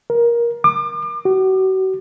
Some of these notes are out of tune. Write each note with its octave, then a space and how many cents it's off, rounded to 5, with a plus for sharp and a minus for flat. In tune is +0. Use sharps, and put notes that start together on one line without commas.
A#4 +15
D6 +35
F#4 +40